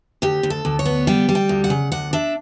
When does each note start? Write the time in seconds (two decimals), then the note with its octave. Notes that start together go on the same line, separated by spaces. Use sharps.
0.22 D2 G4
0.43 D2
0.50 A4
0.65 D2
0.79 C#5
0.86 B3
1.07 G3 G5
1.29 G3
1.35 G5
1.49 D2
1.64 F#5
1.70 C#3
1.92 D2 F#5
2.13 D4 E5